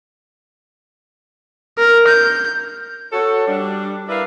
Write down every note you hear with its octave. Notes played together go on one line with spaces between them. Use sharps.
A#4
G6
F#4 A4 C#5
G3 D4
E4 A#4 B4 D5 E5 F5